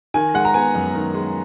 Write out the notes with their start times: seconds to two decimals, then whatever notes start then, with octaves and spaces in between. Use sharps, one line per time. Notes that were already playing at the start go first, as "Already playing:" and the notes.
0.14 D#3 G#5
0.34 G#3 F#5
0.45 A#5
0.54 B3 G#5
0.75 F#2
0.95 D#3
1.14 G#3